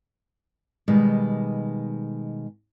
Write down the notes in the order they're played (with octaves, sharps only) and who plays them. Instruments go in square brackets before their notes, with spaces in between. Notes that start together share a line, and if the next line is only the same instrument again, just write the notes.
[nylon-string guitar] B2 D#3 G3 G#3 B3